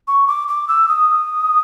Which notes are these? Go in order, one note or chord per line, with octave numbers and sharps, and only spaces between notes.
C#6
D6
D6
E6
D#6